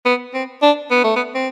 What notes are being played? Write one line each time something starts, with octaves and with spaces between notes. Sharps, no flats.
B3
C4
D4
B3
A3
B3
C4